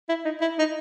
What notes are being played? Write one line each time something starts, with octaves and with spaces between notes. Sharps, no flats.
E4
D#4
E4
D#4